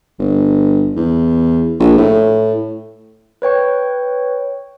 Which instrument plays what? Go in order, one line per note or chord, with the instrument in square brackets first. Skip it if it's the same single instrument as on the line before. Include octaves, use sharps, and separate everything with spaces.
[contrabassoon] G1
E2
A#1
A2
[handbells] B4 C#5 G5 C#6